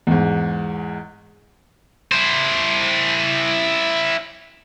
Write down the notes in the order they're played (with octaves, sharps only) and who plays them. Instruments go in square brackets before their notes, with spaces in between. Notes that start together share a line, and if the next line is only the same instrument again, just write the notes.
[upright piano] E2 G#2
[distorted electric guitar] E4 C5